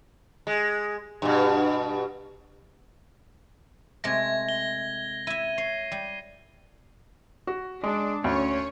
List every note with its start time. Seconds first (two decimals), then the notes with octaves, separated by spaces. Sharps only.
0.47 G#3
1.22 G2 B2
4.04 C3 G#3 A3 G#6 A#6
4.49 G7
5.27 E4 E5 D#7
5.58 C#5 C7
5.92 G3
7.47 F#4
7.84 G#3 D4
8.24 D2 C#4 C#5